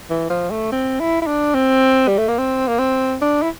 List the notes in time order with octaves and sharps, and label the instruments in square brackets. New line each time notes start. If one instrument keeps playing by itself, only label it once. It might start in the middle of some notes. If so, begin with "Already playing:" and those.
[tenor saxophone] E3
F3
A3
C4
E4
E4
D4
C4
G3
A3
A#3
C4
A#3
C4
D4
E4